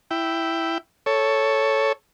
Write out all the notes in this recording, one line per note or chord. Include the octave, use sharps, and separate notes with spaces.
E4 G5
A4 C#5